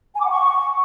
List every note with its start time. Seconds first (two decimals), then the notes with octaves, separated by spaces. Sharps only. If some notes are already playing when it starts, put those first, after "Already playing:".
0.15 G#5
0.20 D6
0.25 F#5
0.31 C#6